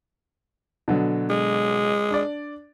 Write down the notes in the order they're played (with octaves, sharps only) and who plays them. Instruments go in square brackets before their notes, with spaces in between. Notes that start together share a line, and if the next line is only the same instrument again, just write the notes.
[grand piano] B2 D3 F#3
[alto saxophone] G#3
[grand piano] D4 D5